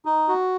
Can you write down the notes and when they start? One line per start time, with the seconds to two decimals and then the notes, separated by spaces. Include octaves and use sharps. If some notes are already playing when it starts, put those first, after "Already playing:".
0.05 D#4
0.28 F#4